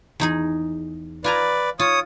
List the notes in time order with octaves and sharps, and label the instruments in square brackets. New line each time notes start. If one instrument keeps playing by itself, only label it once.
[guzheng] E2 D#4 G#4
[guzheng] F4 G#5 A#5 [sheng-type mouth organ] B4 D5
[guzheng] F4 [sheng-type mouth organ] C#5 D#6